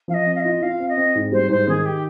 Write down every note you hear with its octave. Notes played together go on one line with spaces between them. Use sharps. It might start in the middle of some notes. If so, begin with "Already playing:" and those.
F3 F5
D#5
C4
F5
F4 D#5
F4 F5
C4
D#5
C4
G#2
G3 C5
G#2 C5
D#3 G#4
G4